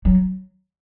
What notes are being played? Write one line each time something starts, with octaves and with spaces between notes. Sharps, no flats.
F#3